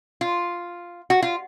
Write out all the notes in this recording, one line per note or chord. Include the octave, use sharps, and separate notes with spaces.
F4
F#4
F4